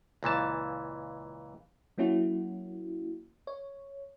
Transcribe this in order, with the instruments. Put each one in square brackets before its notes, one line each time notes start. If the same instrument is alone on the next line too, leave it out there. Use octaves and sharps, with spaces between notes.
[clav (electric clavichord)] C#2 A#2 E3 A5
[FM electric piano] F#3 A#3 C#4 E4 F#4
C#5